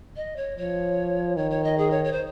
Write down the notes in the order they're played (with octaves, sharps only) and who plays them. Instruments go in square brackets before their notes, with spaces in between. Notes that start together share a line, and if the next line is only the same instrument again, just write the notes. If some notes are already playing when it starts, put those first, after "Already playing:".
[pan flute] D#5
C#5
[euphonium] F3 [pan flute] C#5
[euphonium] D#3 [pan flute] C#5
[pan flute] C#5
D#5
G#4
C#5
C#5
C5